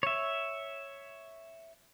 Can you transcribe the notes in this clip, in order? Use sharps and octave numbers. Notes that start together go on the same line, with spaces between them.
C#5 E5